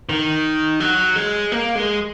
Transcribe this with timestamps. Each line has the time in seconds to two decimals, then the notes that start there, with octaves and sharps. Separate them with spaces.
0.09 D#3
0.80 F#3
1.16 G#3
1.52 A#3
1.75 G#3